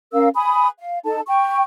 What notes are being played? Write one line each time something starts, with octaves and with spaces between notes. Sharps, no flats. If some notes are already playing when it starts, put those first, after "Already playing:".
C#4 A#4 F5 E6
G#5 B5 D#6
F5
D#4 A4 A5
G5 C#6